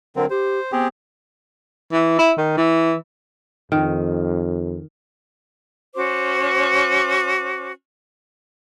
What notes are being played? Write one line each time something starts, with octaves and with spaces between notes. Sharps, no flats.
D3 F#3 C4 A#4
G4 C5
B3 C4 G4 G#4
E3
E4
D#3
E3
F2 D#3
C#4 F#4 C5 D6